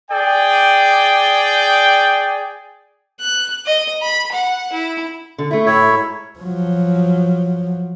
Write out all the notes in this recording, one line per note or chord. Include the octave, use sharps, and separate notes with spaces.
G#4 D5 G5
F#6
D#5
B5
F#5
E4
D3
A3 E4
A2 E4 C#5
G#2
F3 F#3